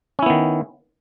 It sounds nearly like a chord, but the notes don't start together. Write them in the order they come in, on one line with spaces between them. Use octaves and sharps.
C#4 E4 B3 D#3